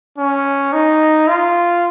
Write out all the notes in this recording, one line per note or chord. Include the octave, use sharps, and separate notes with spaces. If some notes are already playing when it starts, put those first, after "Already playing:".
C#4
D#4
F4